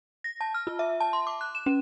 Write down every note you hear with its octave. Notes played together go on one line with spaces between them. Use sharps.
A#6
A5
F6
F4
E5
A5
C6
D6
F#6
E7
C#4